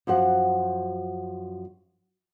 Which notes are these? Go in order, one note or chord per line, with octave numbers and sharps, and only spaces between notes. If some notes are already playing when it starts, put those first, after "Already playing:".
F#2 F3 F#4 F#5